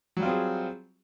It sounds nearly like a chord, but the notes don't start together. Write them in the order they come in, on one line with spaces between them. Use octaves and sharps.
F#3 G3 F4 C4 G#4